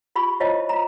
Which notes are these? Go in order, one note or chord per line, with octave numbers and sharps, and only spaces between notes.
F4 G4 B5 C#6
E4 F4 C5 C#5 D#5 A5
F4 A#5